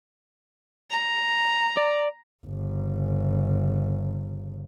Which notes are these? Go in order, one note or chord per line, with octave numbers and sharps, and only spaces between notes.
A#5
D5
G1 C#3